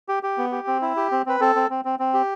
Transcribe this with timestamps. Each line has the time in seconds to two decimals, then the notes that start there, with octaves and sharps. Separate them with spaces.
0.08 G4
0.23 G4
0.38 B3
0.52 G4
0.67 C4
0.82 E4
0.97 G4
1.12 C4
1.26 C4 B4
1.40 C4 A4
1.56 C4
1.70 C4
1.85 C4
1.99 C4
2.14 G4